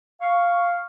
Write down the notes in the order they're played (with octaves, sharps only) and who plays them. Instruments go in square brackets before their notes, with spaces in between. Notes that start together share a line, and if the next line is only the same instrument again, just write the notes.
[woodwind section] F5 C#6